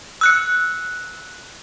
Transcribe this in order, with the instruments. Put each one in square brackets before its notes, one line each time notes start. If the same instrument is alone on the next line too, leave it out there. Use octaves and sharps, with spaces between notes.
[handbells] E6 F#6 C#7